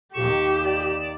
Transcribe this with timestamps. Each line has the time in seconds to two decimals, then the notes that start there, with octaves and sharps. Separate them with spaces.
0.14 D#2 D#3 G4 C#6 E7
0.65 D5